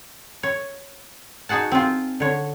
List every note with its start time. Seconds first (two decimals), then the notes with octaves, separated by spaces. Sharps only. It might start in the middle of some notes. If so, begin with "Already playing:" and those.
0.43 C#5
1.49 D#4 F#4 G#4 F#5 A5
1.72 C4 F4
2.20 D3 C#5